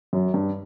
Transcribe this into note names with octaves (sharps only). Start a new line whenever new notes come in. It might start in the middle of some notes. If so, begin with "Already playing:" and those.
F#2
G2